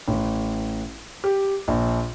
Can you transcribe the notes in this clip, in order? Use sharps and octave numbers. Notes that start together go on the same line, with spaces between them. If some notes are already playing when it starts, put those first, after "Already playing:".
A1
G4
A#1